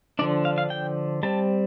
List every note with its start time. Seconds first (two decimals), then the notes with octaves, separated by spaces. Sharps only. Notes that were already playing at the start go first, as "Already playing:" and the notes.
0.19 D3 F3 D4 D5
0.45 F5
0.58 F5
0.70 G5
1.23 G3 C4 A5